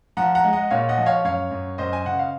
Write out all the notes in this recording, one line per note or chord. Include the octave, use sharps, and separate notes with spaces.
F3 F#5 A#5
F#5 A#5
G#3
D#5 F#5
A#2 C#5 F5
D#5 F#5
F3
C#5 F5
F#2 C#5 F5
F#2
F#2 C5 D#5
G#5
C#3 F#5
F5